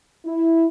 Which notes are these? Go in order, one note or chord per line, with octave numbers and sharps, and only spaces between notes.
E4